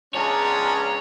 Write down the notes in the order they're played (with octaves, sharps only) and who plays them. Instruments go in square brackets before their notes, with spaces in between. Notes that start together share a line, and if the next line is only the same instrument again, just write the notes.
[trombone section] C#2 [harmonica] C#4 D4 [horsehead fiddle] G#4 A#5 [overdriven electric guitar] C#5